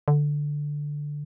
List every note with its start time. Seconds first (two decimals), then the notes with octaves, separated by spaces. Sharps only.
0.08 D3